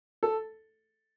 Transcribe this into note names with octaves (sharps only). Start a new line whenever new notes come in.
A4